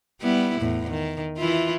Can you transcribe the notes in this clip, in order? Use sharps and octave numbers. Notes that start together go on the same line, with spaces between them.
G3 B3 E4
E2 A2
D#3
E3 E4 F4